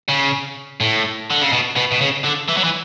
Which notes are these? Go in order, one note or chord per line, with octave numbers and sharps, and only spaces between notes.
C#3
A2
D3
C#3
B2
B2
B2
C#3
D3
E3
F#3
E3